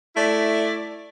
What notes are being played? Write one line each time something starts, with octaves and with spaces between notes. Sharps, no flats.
A3 E4 D5